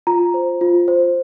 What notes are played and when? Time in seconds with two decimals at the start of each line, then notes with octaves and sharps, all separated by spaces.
0.07 F4 A#5
0.34 C5
0.61 F4
0.88 C5